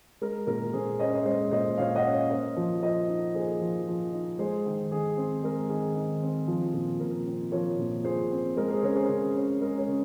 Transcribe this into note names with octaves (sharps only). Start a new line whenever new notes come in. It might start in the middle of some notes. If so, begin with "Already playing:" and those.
G#3 A#4
A#2 A#4
A#2 G#4 C5
C#4 C5 D#5
C5 D#5
G#3 C5 D#5
A#2 C5 D#5
A#2 C#5 F5
D#5 F#5
C#4
C#5 F5
A#3 C5 D#5
F3
F3 C5 D#5
D#4
A#3 G#4 C5
F3
F3
D#4
G#3 G#4 C5
D#3
D#3 G#4
C4
G#3 A#4
D#3 G#4
D#3
C4
F3
A#2
A#2 A#4
C4
F3 A#4 C#5
A#2
A#2 G#4 C5
C4
G#3 A#4
G#4 C5
C#3 A#4 C#5
G#4 C5
A#4
C#3 G#4
C#4
G#3 A#4
A#4 C#5
C#3